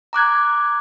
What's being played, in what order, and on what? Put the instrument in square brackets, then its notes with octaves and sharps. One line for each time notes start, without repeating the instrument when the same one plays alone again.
[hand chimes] A#5 D6 F#6 G#6